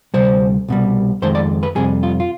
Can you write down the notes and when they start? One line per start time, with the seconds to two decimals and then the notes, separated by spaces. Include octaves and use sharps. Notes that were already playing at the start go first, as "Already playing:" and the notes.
0.14 D2 C3 G3 C5
0.68 C2 B2 G3
1.22 F2 D#3 G#3 C5
1.35 D5
1.63 B4
1.75 F2 C3 G3 G#4
2.03 F4
2.20 F4